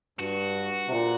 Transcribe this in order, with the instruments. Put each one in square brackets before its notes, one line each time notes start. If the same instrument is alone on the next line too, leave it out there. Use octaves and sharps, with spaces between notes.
[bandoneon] G2 [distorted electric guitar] F#4
[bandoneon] C3
A#2